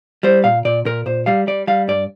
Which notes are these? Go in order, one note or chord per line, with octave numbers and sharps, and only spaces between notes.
G3 C5
A#2 F5
A#2 D5
A#2 A#4
A#2 C5
G3 F5
G3 D5
G3 F5
G2 D5